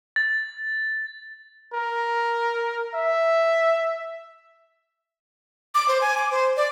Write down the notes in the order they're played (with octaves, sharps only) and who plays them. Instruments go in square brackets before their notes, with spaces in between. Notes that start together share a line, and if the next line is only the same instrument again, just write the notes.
[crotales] A6
[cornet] A#4
E5
[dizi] D6
C5
G#5
D6
C5
D5